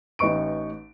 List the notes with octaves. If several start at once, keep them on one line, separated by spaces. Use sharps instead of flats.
A1 D#4 B4 C#6 D7